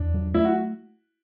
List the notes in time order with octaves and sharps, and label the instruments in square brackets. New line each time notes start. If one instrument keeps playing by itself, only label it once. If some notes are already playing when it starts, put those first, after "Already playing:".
Already playing: [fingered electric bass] E2 [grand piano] D4
[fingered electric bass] F#3
[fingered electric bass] A3 [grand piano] E4
[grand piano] F#4